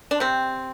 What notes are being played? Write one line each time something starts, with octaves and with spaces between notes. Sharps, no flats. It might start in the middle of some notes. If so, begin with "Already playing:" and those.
D4
C3 C4